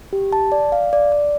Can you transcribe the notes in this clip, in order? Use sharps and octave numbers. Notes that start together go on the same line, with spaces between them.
G4
A5
D5
F5
D5
D5